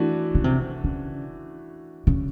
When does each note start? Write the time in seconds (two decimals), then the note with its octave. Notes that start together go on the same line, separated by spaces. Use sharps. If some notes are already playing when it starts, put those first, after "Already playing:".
Already playing: E3 A3 D4 F#4
0.35 C#3
0.44 C3
0.84 C#3
2.07 C#3